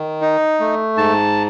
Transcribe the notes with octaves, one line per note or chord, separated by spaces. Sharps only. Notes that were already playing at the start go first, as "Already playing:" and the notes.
Already playing: D#3
D#4
A3
G#2 A5